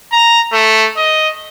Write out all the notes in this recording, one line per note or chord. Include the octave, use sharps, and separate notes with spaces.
A#5
A3
D#5